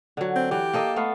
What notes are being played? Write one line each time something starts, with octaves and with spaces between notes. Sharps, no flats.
D3 F#3
C4
E3 G4
A#3 A4 D#5
A3 B3 F5